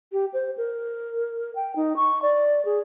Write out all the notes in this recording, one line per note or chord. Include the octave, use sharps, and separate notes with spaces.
G4
C5
A#4
G5
D#4
C#6
D5
G#4